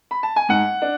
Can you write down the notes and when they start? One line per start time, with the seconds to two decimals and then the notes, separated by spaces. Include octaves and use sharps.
0.11 B5
0.23 A5
0.36 G#5
0.49 G#2 F#5
0.82 D4